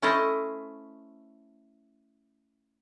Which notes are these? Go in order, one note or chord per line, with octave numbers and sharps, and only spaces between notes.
A3 C#4 E4 A4 C5 D#5